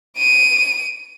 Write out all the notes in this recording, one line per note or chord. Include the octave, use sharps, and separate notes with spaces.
D7 D#7